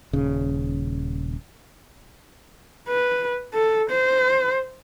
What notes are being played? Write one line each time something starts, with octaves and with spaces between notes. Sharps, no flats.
D#1 C#3
B4
A4
C5